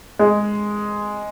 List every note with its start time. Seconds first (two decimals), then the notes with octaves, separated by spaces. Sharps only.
0.19 G#3